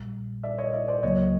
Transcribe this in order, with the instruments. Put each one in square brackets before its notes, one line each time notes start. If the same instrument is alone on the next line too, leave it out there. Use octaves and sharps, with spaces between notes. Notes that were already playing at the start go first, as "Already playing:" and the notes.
Already playing: [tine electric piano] A#1 A#2 G3
[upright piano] D5 E5
C#5 D#5
D5 E5
C5 D5
[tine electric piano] C#2 C#3 F#3 A#3 [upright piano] C#5 D#5
[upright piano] D#5